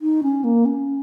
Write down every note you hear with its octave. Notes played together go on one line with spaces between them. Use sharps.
D#4
C#4
A#3
C#4